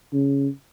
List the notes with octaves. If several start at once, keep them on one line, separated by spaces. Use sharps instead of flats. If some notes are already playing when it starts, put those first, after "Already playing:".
C#3